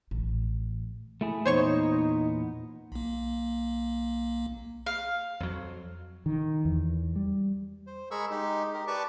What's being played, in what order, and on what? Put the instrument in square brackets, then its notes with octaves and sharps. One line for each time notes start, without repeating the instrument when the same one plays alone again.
[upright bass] A1
[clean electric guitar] A3 E4 G#4
[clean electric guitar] E2 A#2 B3 [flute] D#4 [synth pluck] C5 C#5 C#6
[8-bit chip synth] B1 A#3
[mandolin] F5
[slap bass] F2 F#3
[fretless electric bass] D#3
E2
G3
[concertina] C5
G#3 G#4 A#4 B5 C#6 E6
G#3 D#4 G4
G4 A#4
G4 B4 D5 A5 C#6 D6